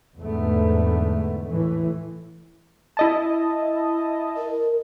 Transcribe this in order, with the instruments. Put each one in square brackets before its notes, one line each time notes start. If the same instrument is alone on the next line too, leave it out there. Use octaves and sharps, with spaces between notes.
[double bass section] E2 G#2 D3 A3 B3
A2 E3 A3
[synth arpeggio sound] E4 D#5 A5
[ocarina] A#4